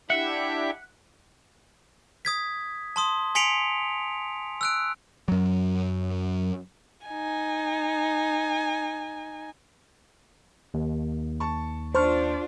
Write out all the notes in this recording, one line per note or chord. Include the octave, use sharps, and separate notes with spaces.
D4 E4 G4 E5 F#5
D#6 G#6 B6
A5 C6 D#6
G#5 C6 B6 C#7 D7 F7
E6 F#6 D7
F#2 F#3
D#4 G#5
D#2
A5 C#6
D4 F4 C5 A5 C#6 F6